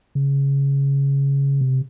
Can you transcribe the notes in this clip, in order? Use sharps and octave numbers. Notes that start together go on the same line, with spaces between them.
C#3
C3